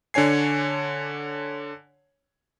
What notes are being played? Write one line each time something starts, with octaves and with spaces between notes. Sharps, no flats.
D3 D4 C#5 G#5 C7